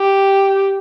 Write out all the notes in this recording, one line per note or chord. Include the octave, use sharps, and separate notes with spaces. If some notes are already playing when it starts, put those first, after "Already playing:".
Already playing: G4